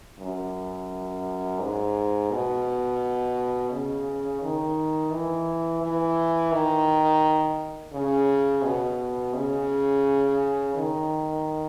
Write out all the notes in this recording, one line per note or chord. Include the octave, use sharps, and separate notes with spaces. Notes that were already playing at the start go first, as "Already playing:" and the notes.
F#2
G#2
B2
C#3
D#3
E3
E3
D#3
C#3
B2
C#3
D#3